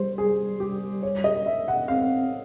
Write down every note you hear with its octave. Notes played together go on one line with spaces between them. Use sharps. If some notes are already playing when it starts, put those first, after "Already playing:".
Already playing: G3 C5
G#4
G4
C#5
D#5
E5
F#5
C4 F5